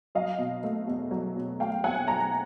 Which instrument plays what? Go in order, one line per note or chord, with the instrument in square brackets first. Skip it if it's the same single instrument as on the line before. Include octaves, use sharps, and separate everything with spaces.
[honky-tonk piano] F#3 D#5 F5
B2
A3
E2
F#3
B2
A3 F5 G5
E2 F#5 G#5
F#3 G#5 A#5